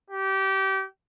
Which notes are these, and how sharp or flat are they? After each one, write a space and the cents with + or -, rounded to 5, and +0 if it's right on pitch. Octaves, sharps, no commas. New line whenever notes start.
G4 -25